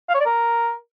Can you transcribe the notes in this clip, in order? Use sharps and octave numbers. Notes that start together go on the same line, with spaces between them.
F5
C#5
D5
A#4